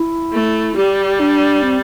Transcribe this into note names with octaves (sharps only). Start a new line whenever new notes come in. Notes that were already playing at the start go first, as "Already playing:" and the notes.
Already playing: E4
A3
G3 G4
D4
C4